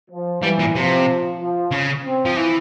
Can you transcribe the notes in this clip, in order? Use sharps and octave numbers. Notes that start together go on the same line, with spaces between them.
F3
E3 G3
A#2
C3 F3
F3
C#3
C4
F3
E3